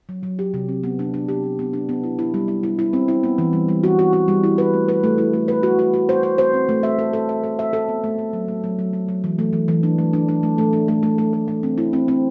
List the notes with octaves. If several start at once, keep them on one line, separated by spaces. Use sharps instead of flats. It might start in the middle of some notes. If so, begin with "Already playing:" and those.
F#3
F#3
G4
C3
C4
B3
D4
D4
G4
D4
B3
D4
B3
E4
E4
G3
E4
E4
E4
C4
E4
B3
E3
G3
G3
F#4
F#4
F#4
G3
E4
B4
A3
B4
A3
E4
A3
B4
F#4
F#4
F#4
C5
C5
C5
C4
A3
E5
A4
A4
E5
A4
E5
A4
B3
A3
A3
F#3
A3
F#3
F#3
F#3
F#3
E3
A3
E3
E3
D4
A3
D4
D4
A3
A3
D4
A3
A3
A3
A3
A3
C4
E4
C4
C4